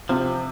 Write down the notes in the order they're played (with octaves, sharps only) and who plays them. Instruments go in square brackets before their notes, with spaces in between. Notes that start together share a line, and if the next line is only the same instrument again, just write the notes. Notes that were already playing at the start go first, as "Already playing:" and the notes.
[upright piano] C3 [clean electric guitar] F3